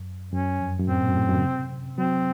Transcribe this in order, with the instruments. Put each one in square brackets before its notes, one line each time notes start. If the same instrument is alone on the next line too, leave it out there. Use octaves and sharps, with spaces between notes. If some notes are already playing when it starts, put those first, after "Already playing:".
Already playing: [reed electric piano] F#2
[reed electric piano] F#2 [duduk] C#4
[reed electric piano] F2
F#2
[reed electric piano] A2 [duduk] C4
[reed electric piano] A#2
F#2
A2
F#2
C#3
C3
[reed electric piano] F#3 [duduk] C4